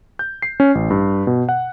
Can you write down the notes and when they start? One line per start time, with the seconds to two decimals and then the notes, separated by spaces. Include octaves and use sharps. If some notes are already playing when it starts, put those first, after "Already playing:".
0.19 G6
0.42 C7
0.60 C#4
0.75 A1
0.90 G2
1.27 B2
1.49 F#5